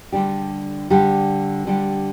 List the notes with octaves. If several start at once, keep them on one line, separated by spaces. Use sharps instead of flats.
D3 G3 D4 G4
D3 G3 D4 G4
D3 G3 D4 G4